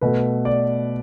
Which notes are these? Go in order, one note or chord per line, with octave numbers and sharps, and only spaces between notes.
B2 A3 B4
D5